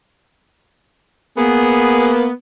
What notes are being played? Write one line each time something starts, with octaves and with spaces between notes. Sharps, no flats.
A#3 B3 G#4